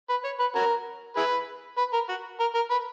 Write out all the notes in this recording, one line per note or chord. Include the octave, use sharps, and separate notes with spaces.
B4
C#5
B4
C#4 F#4 A#4
E4 G#4 B4
B4
A#4
F#4
A#4
A#4
B4